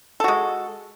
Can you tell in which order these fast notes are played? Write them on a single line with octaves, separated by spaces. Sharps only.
A4 F#4 G#3